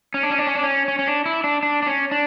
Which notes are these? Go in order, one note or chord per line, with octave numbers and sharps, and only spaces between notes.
C#4
D4
C#4
D4
C#4
D4
C#4
C#4
C#4
D4
E4
D4
D4
D4
C#4
D4